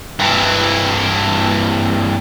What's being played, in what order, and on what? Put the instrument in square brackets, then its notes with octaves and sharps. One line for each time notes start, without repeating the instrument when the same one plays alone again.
[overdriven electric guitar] G2 E3